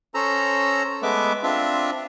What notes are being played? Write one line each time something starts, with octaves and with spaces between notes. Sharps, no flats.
C#4 A4 C5 A#5 E6
G#3 A3 B3 B4 E5 D6
C4 D4 F4 E5